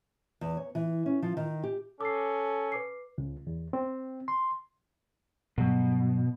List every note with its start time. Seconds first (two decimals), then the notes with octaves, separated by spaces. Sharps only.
0.41 E2
0.57 C#5
0.75 E3
1.06 C#4
1.22 F3
1.37 D#3
1.63 G4
2.01 C#4 A4 D6 C7
2.72 B4 D6 C7
3.18 C#2
3.47 E2
3.73 C4
4.28 C6
5.58 G2 B2 F#3